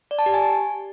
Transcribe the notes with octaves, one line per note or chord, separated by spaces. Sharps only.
D5
A5
G4
G#5